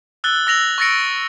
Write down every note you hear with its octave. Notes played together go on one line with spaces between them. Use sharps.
E6 F#6 A6 G7
E6 A#6 F7 F#7
C#6 E6 A6 A#6 C#7 D7